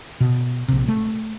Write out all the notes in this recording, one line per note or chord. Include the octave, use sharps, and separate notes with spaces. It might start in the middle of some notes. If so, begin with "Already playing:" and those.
B2
A#1 C3
A3